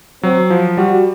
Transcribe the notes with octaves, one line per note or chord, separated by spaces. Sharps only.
F#3 C4
F3
G3 F#4